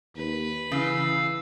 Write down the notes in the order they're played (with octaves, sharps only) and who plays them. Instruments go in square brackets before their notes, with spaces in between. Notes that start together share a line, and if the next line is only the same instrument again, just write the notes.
[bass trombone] D#2 [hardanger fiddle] B4
[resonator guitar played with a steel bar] C#3 [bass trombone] E3 [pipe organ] F5 E6